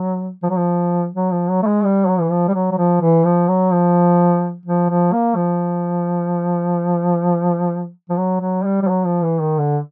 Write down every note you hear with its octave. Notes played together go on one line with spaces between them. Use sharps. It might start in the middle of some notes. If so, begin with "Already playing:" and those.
Already playing: F#3
F3
F#3
F3
F#3
F3
F#3
A3
G#3
G3
F#3
E3
F3
G3
F#3
F#3
F3
E3
F3
F#3
F3
F3
F3
A#3
F3
F3
F#3
F#3
G3
G3
F#3
F3
E3
D#3
D3